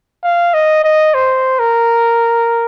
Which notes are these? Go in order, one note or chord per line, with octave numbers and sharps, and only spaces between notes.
F5
D#5
D#5
C5
A#4